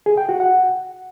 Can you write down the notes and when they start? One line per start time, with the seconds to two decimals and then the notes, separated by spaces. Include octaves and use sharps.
0.06 G#4
0.17 G5
0.29 F#4
0.40 F#5